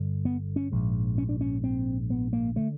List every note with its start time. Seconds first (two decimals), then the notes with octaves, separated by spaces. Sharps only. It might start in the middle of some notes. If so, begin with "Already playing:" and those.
Already playing: G1 G2 D3
0.25 B3
0.56 C#4
0.72 A#1 G#2
1.18 C#4
1.29 D4
1.41 C#4
1.64 C4
2.10 B3
2.33 A#3
2.56 D3 A3